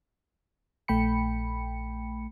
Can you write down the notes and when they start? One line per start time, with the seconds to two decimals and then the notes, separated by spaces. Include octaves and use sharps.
0.88 A#1 A3 G5 B5 C#7